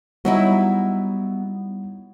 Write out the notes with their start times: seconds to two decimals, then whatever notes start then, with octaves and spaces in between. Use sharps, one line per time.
0.25 F#3 G3 B3 D#4 E4